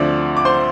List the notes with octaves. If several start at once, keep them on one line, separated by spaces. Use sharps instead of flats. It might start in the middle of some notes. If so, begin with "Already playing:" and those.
Already playing: D2 D3 F3 C4 D5
D6
C5 C6